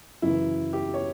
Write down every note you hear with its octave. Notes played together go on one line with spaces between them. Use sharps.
F#2 C#3 E3 E4
G4
C#5